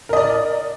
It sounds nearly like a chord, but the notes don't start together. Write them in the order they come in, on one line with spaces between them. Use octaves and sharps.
A#4 D#5 D5